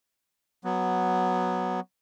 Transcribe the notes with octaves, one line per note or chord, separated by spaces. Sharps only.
F#3 B3